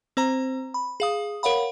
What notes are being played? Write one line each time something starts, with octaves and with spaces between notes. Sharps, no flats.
C4 C5 A#5
B5
G#4 F5 D#6
A#4 C#5 F5 F#5 B5